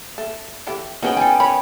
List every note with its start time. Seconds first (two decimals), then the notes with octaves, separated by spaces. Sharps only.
0.18 A3
0.67 E3 A3 G4
1.03 B3 C#4 D#4 F#4 G#4 G5
1.17 B3 A4 G5 G#5
1.40 A#4 B4 C#5 B5